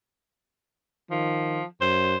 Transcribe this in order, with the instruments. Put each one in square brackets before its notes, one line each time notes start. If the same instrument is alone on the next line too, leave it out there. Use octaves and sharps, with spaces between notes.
[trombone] D#3 [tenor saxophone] F3
[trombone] F#2 [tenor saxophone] C5